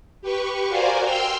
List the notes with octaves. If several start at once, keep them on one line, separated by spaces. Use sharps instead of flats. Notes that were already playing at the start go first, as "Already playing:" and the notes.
G4 B4 C#6
F#4 A#4 C5 D5 F5 G#5
G5 C6 E6 F6 G6